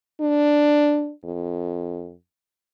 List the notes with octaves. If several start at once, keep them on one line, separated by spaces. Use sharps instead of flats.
D4
F2